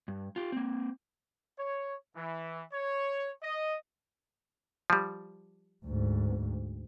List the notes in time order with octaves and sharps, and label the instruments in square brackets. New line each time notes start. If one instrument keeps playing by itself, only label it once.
[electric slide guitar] G2
F4 G4
A#3 C4
[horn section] C#5
E3
C#5
D#5
[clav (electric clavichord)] F3 G3
[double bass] D2 G#2